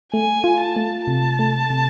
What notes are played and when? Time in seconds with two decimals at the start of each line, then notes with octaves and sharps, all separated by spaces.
0.13 A3 G#5
0.44 F4
0.60 A5
0.76 A3
1.07 C3 A5
1.39 A3
1.70 C3